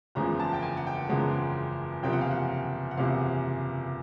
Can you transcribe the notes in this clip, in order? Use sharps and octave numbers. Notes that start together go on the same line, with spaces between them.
F#1 E2 C#3 F3 G#3 A#5
A5
G5
G#5
F#5
G5
F#1 E2 C#3 F3 G#3 F#5
F#1 E2 C3 F3 G5
F#5
F5
F#5
F#5
F#1 E2 C3 F3 F5